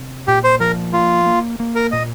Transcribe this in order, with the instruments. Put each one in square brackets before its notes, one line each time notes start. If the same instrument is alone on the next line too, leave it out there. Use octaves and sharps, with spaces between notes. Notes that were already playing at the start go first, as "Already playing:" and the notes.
Already playing: [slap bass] C3
[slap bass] A#2 [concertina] G4
[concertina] C5
[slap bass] F3 [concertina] A#4
[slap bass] A#3 [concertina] F4
[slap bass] A#3
A#3
[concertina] A#4
[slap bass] A#2 [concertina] D#5